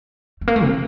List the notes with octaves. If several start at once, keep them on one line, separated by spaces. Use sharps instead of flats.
A3
A#3
A3
C3